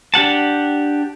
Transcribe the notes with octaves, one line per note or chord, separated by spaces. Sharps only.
D4 G4 F#5 A5